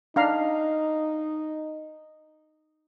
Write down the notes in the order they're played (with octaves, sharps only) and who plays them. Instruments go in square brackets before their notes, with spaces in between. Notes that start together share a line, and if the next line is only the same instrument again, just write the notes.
[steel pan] D4 F5 A#5 [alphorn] D#4